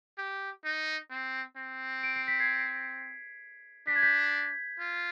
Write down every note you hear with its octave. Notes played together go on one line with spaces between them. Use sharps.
G4
D#4
C4
C4
D7
C7
B6
G#6 C7
D4 B6
G#6
G6 B6
F4